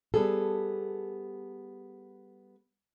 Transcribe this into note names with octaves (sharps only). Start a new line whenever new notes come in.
G3 B3 G#4 A4